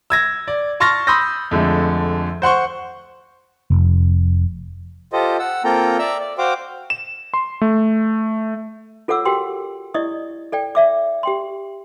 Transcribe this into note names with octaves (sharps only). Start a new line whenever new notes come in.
E6 G#6 A#6
D5
A5 C6 C#6 F6 A6 A#6
B5 C6 D#6 E6 G6 A#6
F2 D3 G#3 A3
C5 F#5 C6 C#6
F1
F4 G4 A4 C5 D#5
F#5 E6
A#3 C4 F4 A4 G5 A#5
D5 E5 A#5 E6
D5
F#4 C5 F5 G5 D6
E7
C6
A3
F4 A4 C#5 F#5 D6 E6
F#4 G4 A#4 G5 C6
E4 D5 D#5 C#6 D#6
A4 D5 G5
D5 E5 D6
G4 G5 C6